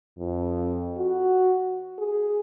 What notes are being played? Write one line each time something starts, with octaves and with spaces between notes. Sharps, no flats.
F2
F#4
G#4